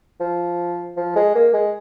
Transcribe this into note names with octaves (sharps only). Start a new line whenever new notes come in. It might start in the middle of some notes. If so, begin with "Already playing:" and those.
F3
F3
G#3
A#3
G#3